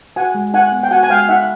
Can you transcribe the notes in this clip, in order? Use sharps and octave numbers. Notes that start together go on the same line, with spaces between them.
F#4 F#5 G#5
G#3
D#4 F#5 G#5
B3
G5
F#4 F#5 G#5
G#5
G#3 F5 G5
D#4 E5 F#5